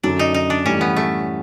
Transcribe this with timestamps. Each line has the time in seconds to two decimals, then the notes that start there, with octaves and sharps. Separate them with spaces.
0.04 F#2 D3 F#3 D4
0.19 D#4
0.34 D#4
0.50 D4
0.65 A2 E3 G3 C#4
0.81 B3
0.96 A3